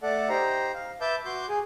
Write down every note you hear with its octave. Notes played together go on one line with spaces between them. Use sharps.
A3 A4 D5 F#5
D#4 G4 C5 A#5
F5
B4 E5 A5 D6 G6
F#4 C6 D6 G6
G#4